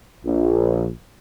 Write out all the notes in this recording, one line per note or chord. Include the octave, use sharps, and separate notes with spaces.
A#1